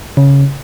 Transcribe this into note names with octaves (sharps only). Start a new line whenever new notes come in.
C#3